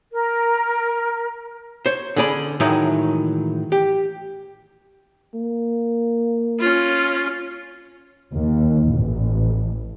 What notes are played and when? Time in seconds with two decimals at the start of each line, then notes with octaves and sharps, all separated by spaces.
0.13 A#4
1.86 C5 C#5
2.16 D3 C#4 G#4 D5 B5
2.60 A2 D#3 E3 F#3 G#3
3.72 G4
5.35 A#3
6.59 C#4 F4
8.33 D#2
8.93 A1